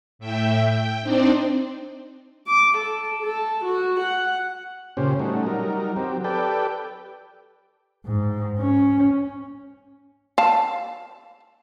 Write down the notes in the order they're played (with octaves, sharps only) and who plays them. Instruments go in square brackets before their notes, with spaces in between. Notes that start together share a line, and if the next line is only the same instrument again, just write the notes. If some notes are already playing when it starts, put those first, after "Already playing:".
[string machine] A2 E5 G5
G5
C4 D4 D#4 C5 D5
[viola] D6
A4
A4
F#4
F#5
[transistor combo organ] A#2 C#3 C#4 G4 C5
G3 A3 C#4 D#4 F#4
F#3 G3 D#4 A#4
F#3 C4 G4
G4 A4 B4 D5 G5
[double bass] G#2
C#4
[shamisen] F5 A5